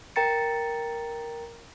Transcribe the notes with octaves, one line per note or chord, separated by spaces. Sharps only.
A#4 G5 A#5 A6 C#7